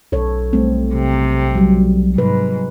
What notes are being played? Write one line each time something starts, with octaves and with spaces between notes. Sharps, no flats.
B1 A4 C#5
G3 A3 C4
C3
F#3 G3
G#2 C3 B4